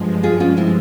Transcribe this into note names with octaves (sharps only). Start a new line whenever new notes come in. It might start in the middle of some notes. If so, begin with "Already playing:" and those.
Already playing: G2 F3 G#3
F4 G#4
C#4 F4
C4 E4